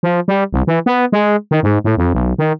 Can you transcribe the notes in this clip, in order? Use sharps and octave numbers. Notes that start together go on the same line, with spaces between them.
F3
G3
C2
E3
B3
G#3
D#3
G#2
A2
F2
B1
D#3